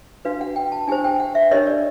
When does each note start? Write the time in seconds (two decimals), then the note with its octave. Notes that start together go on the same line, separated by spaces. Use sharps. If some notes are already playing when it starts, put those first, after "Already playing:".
0.25 D4 F#4 B4 F5
0.41 F#5
0.56 G5
0.72 A5
0.87 D4 G4 C5 G#5
1.04 G5
1.20 F#5
1.35 E5
1.51 D4 G4 A#4 C#5 D#5
1.67 D5